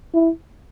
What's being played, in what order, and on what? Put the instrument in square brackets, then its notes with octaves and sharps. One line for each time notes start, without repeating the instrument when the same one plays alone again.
[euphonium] E4